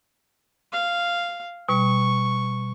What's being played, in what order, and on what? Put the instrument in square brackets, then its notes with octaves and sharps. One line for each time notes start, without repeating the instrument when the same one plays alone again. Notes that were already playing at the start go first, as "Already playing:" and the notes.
[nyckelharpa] F5
[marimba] B2 G3 [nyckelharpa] C#6